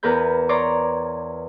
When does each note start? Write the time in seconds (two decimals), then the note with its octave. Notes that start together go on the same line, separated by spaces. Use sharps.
0.03 E2 A#4 B4 B5 G6
0.49 C#5 D5 A#5 C6 D6